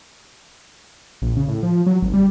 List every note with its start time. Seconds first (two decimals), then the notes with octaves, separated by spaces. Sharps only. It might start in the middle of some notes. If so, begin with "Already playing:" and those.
1.22 A#1
1.36 C#3
1.48 A2
1.63 F3
1.86 F#3
2.02 G#1
2.14 G3